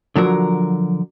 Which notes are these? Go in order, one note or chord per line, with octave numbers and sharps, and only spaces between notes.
D3 F3 F#3 A#4